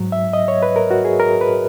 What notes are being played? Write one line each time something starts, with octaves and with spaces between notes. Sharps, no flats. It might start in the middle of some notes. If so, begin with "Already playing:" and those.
Already playing: G#2 F#3
E5
D#5
C#5
B4
A#4
F#4
G#4
A#4
B4